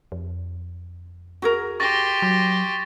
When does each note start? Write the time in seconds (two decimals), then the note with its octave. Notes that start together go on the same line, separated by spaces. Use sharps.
0.12 F2
1.42 F#4 G#4 A#4
1.80 G4 C6 C#6 A6 A#6
2.22 F#3